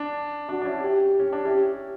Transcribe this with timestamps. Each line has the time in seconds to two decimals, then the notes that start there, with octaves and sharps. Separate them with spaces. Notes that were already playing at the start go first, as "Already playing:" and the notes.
Already playing: D4
0.49 D4 F#4
0.62 D4
0.65 C#4 E4
0.82 G4
1.19 C#4
1.33 D4
1.45 C#4 E4 G4